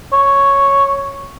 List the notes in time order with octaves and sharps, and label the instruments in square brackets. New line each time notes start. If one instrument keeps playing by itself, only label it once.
[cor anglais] C#5